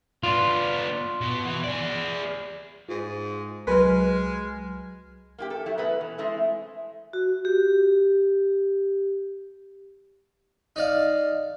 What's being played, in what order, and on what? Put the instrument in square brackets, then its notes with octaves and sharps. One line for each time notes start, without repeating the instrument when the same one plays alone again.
[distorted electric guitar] B3 D4 [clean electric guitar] F4
[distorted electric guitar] B2
E3
G#4 D5
[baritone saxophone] G#2 [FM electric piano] F4
[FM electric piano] C2 F#3 F6 [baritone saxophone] G#3 [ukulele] B4
[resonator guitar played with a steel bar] A#3 F4 G4
A4
F#3 A3 E4
B2 B3 A4 B4 F#5
E3
G#3 A3 C4 E4
[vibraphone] F#4
G4
[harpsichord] D#4 D5 F5